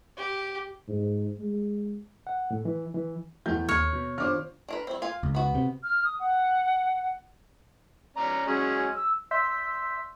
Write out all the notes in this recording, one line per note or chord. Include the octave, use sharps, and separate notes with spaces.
G4
G#2
G#3
F#5
A2
E3
E3
E2 A3 E4 G6
D#2 C#5 F6
B2
D#3 D4 F4 C5 D6 F6
D4 A#4 B4
G3 C4
F4 F5 G#5
C#2
B3 F#4
C3
F6
D#6
F#5
C#4 D5 A#5
F#3 G#3 C#4
E6
D5 E5 C6 E6 G6 B6